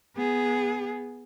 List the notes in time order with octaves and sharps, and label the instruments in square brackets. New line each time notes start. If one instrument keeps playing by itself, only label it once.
[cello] B3 G#4